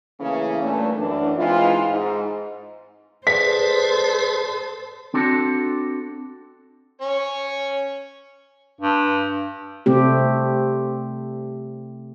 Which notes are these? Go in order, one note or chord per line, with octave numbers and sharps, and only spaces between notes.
C#3 E3 A3 A#3 C#4
G2 A#2 E3 A3
F#2 E3 D4
E3 G#3 C4 D#4 F4
G#2
G#4 A4 B4 C5 D5 B6
C4 D4 F#4 A4
C#4 C#5
G2
C3 A3 C4 G4